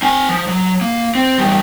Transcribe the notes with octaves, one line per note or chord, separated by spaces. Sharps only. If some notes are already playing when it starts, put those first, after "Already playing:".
C4 G#5
F3
F#3
A#3
C4
E2 G3